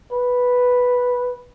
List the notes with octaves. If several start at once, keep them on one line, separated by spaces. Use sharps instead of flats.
B4